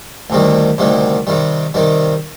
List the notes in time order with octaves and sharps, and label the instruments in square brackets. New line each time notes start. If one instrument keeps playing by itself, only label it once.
[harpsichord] D2 C3 D#3 G3
D2 C3 D#3 G3
C3 D#3 G3
C3 D#3 G3